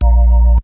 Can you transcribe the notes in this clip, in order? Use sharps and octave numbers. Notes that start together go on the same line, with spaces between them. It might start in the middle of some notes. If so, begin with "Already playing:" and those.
A#1